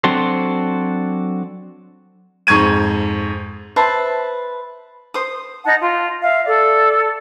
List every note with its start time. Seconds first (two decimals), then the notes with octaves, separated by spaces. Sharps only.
0.04 F#3 C4 D4 F#4 A4 C5
2.47 F2 G#2 C#6 G#6 D#7
3.76 B4 C5 E5 A5
5.14 C5 D#6
5.63 D#4 F#5 A5
5.79 F4
6.21 E5 F5
6.45 A4 D5